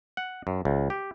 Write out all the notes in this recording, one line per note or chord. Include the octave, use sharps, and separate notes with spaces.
F#5
F#2
C#2
G4